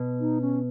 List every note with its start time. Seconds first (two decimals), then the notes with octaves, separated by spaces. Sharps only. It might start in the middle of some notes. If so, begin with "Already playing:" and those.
Already playing: B2
0.20 D#4
0.41 C#4